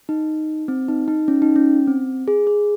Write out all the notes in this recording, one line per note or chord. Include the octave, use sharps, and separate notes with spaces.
D#4
C4
D#4
D#4
C#4
D#4
C#4
C4
G#4
G#4